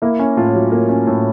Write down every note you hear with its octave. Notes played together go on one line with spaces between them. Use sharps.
A#3 E4
C#4
A2 F4
F#3
A#3
C#4
A2